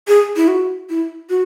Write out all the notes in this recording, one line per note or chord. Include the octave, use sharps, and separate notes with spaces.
G#4
E4
F#4
E4
F#4